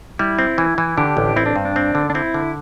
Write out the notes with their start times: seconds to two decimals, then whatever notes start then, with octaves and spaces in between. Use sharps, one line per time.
0.19 G3 E4
0.39 C4
0.58 E3
0.78 E3
0.98 D3 D4 G4
1.17 A1
1.36 C4 E4
1.46 D4
1.56 G2
1.65 D4
1.76 C4
1.95 D3
2.10 D4
2.14 C4 E4
2.34 D3